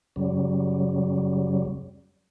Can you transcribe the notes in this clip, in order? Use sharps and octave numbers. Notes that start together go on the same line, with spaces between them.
F#2 C#3 F#3 G3